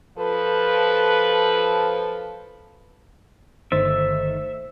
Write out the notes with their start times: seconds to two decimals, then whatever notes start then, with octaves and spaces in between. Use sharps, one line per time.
0.18 F3 A4 B4
3.72 G1 D#3 A3 D#4 C5 E5 A6